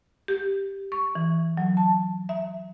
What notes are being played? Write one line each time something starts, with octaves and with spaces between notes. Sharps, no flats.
G4
C#6
E3
F#3
A5
E5